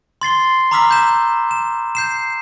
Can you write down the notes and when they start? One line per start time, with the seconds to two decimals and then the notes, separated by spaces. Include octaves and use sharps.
0.22 C6 A6 C7 G7
0.71 A#5 B5 D6 E6 F6 B6
0.91 G6 E7
1.51 E7
1.95 G6 C7 E7